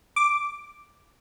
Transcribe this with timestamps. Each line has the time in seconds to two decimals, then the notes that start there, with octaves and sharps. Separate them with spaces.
0.16 D6